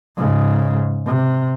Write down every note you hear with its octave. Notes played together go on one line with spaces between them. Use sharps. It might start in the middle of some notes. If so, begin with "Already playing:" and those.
G#2 C#3
C3